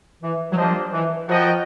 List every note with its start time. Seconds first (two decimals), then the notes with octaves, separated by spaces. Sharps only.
0.21 E3
0.52 F#3
0.57 F3 A#3 D4 G4 C5 D#5
0.92 E3
1.28 F3 F#4 A#4 D#5 G5